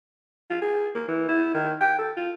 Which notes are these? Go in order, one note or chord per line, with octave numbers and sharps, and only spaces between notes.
F4
G#4
A#3
E3
E4
D#3
G5
A4
F4